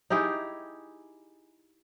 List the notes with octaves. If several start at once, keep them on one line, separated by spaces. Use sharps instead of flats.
D#4 E4 G4 G#4